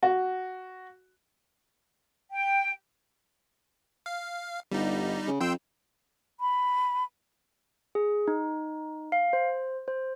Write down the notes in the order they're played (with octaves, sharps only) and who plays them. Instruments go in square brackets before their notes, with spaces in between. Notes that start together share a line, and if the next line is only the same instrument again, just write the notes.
[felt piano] F#4
[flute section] G5
[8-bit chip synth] F5
[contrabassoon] G1 [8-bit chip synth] G3 D#4
[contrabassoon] C#3
[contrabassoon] F2 [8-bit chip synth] G5 C6 E6
[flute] B5
[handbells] G#4
D#4
F5
C5
C5